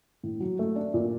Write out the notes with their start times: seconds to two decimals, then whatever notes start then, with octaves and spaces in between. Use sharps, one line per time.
0.23 A2
0.40 F#3
0.59 A3
0.76 D4
0.94 A#2